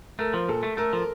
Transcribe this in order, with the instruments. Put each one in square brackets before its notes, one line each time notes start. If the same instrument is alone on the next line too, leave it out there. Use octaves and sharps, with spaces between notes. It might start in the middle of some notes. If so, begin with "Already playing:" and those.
[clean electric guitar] A3 [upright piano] A#4
[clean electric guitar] F3
[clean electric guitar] A#2 [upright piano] A4
[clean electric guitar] A3
[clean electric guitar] A3 [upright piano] A#4
[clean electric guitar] F3